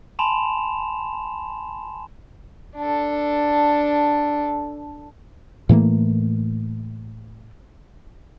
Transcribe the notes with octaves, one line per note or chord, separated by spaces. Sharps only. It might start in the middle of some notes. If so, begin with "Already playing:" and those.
G#5 A5 B5 C6 E7 F7
D4 A4
A2 E3 A3 A#3